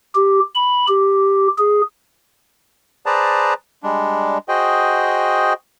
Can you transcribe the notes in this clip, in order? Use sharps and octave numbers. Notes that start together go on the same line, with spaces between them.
G4
B5
G4
G#4
G#4 B4 C5 D5 A5 A#5
G3 G#3 D4
F#4 G#4 C5 D#5 G5